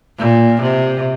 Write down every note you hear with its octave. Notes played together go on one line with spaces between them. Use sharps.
A#2
C3